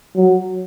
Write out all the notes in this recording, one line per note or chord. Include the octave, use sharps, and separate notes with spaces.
F#3